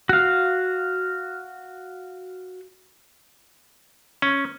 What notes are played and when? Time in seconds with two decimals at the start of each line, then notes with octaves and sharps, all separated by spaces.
0.09 F#4 F5
4.22 C#4